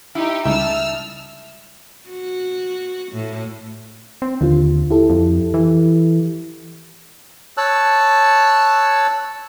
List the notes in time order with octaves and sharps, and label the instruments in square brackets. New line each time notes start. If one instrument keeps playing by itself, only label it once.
[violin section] D#4 G4 [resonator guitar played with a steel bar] E4
[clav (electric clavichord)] C#2 [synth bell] G3 D#4 [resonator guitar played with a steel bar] E5 [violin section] A5 E6 F6
[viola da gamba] F#4
A2
[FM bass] C4
[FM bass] D#2 [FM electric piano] D3 F4
[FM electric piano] E4 G4 A4
[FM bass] F2
E3
[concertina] C#5 A5 E6 F#6